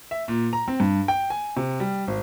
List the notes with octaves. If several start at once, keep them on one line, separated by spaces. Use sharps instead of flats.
E5
A#2
A#5
C4
G2
G5
G#5
C3
G3
G#1